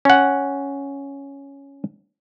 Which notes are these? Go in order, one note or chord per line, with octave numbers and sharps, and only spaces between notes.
C#4 F#5